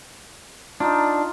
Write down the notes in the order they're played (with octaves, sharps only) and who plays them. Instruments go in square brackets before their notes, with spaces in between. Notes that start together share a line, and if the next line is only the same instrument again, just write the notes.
[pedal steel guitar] D4 [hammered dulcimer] D#4 F4